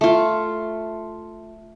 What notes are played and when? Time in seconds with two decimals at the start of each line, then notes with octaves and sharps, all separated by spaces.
0.01 A3 F4